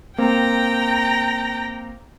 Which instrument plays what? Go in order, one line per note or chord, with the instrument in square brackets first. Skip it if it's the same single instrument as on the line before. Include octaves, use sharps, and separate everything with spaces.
[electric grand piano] A#3 C4 [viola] G5 A#5